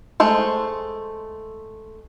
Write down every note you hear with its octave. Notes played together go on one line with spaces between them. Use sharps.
G#3 A3 C5